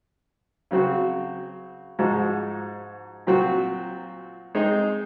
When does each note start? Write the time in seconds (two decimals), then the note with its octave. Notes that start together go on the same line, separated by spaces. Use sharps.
0.71 C#3 F#3 C4 F#4
1.99 G#2 F3 G#3 D#4 F#4
3.27 A#2 F#3 C4 F#4
4.55 G#3 C4 D#4